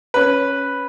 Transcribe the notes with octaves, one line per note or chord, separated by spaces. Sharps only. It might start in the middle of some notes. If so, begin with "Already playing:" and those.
C#4 B4